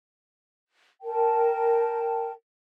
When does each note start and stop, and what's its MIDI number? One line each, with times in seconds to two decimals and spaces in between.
1.02 2.32 70
1.02 2.32 79
1.02 2.32 81